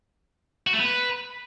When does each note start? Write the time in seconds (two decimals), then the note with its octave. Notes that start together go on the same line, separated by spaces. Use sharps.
0.67 F#4
0.73 A3
0.79 B3
0.85 B4